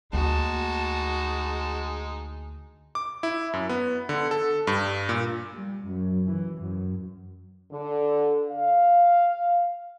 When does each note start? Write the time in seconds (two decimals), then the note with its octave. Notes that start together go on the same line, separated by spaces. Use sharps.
0.13 D2 G#3 A#3 D#4 F#4 A5
2.95 D6
3.23 E4
3.53 F#2
3.69 B3
4.09 D3
4.31 A4
4.67 G2
5.09 A#2
5.54 G3
5.85 F#2
6.29 E3
6.61 F#2
7.72 D3
8.50 F5